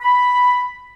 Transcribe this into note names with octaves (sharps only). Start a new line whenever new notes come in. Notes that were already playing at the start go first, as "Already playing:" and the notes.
B5